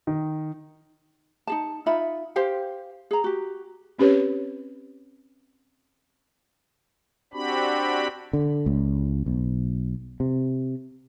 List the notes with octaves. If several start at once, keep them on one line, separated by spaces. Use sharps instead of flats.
D#3
D#4 G#4 A5
D#4 F4 E5 B5
G4 C5 F5 G5
G#4 A#5
F#4 G4
C4 C#4 G4 B4 C#5
C4 D4 F#4 G4 B5
D3
C#2
B1
C3